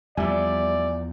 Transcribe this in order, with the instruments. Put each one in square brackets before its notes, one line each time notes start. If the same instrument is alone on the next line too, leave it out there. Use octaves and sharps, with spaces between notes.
[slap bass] E2 F3 [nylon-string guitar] G3 [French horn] D5 [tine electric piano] E5 G#5